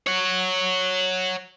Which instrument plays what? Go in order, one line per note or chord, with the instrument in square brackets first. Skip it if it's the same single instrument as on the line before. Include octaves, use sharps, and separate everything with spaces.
[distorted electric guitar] C#5 F#5